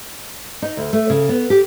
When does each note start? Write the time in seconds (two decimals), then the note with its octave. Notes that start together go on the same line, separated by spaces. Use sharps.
0.62 D#4
0.77 D2
0.93 A3
1.10 C#3
1.29 B3
1.50 G4